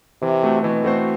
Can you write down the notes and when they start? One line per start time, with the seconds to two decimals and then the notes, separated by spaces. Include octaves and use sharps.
0.22 C3 E3
0.43 A3 C4 F#4 C5
0.63 B2 E3
0.84 A3 C4 F#4 C5